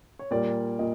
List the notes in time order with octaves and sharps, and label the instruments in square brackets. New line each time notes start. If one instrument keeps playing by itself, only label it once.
[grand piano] C#5
A#2 G3 A#3 D5
A#2 D#5